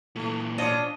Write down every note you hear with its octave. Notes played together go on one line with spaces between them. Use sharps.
A#2 E3 A3
C#4 D4 F4 C5 D#5